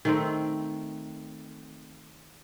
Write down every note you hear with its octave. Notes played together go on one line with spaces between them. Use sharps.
D#3 A3 C4